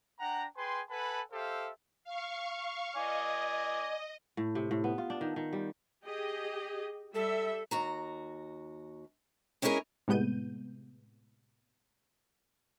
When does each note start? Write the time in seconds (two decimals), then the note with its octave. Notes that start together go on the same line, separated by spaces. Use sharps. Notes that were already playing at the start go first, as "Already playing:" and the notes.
0.20 D4 F#5 G5 A#5
0.57 G#4 B4 G5 G#5 C6
0.90 A4 B4 F#5 G#5 A5 B5
1.32 G4 A4 C5 E5 F5
2.04 F5 C#6
2.96 D5 D#5 G#5
4.37 A2
4.55 C3
4.71 A2
4.84 B3
4.98 F4
5.10 D4
5.21 D#3
5.36 D#3
5.53 G3
6.05 G4 G#4 D#5
7.15 G3 A4 E5
7.71 D#2 F#4 A#5
9.62 G#3 C#4 E4 F4 G#4 A#4
10.08 A2 C3 G#3 B3 G6 D#7